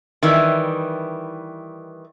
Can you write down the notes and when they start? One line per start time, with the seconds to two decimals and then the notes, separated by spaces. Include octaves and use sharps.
0.23 D#3 E3 G3